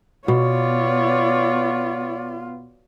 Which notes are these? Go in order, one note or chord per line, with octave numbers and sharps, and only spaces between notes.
B2 B3 F4 C#5 D5